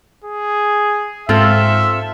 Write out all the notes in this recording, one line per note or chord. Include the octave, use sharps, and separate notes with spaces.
G#4
G#2 C4 F4 A4 E5 F6